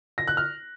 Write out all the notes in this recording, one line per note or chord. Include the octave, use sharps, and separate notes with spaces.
A#6
F#6
F6